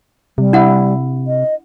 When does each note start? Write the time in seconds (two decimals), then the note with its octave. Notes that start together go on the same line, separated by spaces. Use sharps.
0.38 C3 G3
0.53 D4 E4 F#5
1.27 D#5